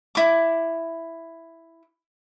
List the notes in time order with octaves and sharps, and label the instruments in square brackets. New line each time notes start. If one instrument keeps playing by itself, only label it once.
[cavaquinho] E4 D6